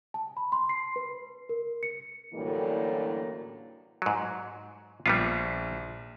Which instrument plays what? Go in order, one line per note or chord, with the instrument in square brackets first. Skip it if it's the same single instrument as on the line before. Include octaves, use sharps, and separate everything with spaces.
[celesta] A5
B5
C6
C7
B4
A#4
C#7
[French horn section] F#2 A2 D3 E3 G3 A#3
[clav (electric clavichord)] G#2 F#3
[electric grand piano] A#1 [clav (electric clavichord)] G3 B3 F4